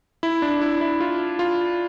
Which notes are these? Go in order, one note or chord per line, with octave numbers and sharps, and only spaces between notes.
E4
D4
E4
E4
F4
F4